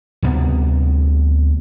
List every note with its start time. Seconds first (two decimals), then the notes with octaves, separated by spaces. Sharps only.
0.22 D2 C3 G3 B3